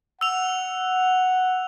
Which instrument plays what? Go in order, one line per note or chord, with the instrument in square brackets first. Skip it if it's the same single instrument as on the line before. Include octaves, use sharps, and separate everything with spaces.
[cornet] F#5 [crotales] E6 F7